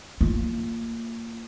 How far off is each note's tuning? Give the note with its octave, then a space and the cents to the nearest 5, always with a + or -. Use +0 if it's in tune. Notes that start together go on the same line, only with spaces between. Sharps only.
A#3 -20 F4 +0